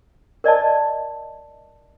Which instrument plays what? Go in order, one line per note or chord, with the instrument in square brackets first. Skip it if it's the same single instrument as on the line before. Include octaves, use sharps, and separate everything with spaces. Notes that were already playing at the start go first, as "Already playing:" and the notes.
[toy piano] A#4 D5 D#5 A5